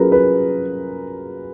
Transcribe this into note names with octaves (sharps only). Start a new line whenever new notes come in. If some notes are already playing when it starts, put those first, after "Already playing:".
Already playing: F#3 C#4 F4 G#4 A#4 B4
B4